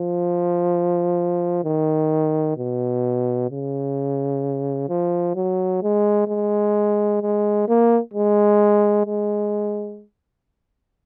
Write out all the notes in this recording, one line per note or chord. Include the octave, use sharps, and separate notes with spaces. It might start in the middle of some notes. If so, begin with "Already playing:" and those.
Already playing: F3
D#3
B2
C#3
F3
F#3
G#3
G#3
G#3
A#3
G#3
G#3